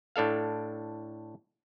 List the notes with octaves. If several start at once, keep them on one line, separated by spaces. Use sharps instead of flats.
A2 D4 A4 F5